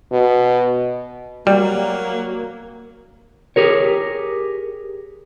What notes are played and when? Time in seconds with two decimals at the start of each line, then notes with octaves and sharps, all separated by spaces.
0.12 B2
1.47 F#3 G3 A#3
3.56 G4 G#4 A#4 C#5